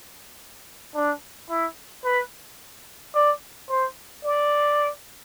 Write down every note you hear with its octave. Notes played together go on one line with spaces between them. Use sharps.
D4
E4
B4
D5
C5
D5